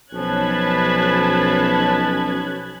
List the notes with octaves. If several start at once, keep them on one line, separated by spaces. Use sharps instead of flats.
B1 F3 C#4 A5 B5 F#6 G#6